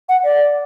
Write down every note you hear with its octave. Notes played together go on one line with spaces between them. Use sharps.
F#5
D5